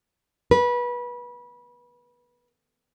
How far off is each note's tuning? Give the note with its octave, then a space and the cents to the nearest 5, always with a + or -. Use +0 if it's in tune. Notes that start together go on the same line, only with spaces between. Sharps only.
B4 -25